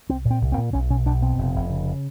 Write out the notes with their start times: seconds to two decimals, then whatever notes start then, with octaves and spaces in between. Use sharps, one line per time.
0.09 C2 C4
0.25 A#2
0.31 C4
0.41 C2
0.52 C4
0.57 A#2
0.73 B1 C#4
0.90 B2 C#4
1.06 B1 D4
1.22 B2 C4
1.38 F1
1.55 F1
1.70 C#3